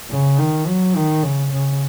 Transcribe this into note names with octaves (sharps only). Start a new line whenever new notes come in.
C#3
D#3
F#3
D#3
C#3
C#3